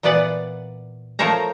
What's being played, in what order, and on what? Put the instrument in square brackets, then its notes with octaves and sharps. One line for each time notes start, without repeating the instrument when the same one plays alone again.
[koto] A#2 E3 B3 B4 D5 F#5
F3 A3 A#4 C5 C#5 A#5